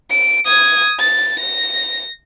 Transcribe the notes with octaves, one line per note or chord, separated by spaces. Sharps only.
D7
D#6 G#6
A6
A#6